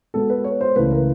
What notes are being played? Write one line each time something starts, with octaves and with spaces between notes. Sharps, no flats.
B2 G#3 B3 A4
B4
C#5
C5
C#2 C#3 E3 A3 B4
A#4